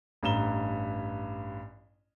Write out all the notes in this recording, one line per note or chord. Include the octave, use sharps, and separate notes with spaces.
A1 G2 A#5 E7 G7